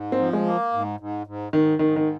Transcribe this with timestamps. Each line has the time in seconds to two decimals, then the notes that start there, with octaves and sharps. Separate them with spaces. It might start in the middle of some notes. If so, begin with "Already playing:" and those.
Already playing: G#2
0.12 C4
0.20 F3
0.33 G#3
0.46 A#3
0.73 G#2
1.00 G#2
1.27 G#2
1.53 G#2 D#3
1.79 G#2 D#3
1.96 D#3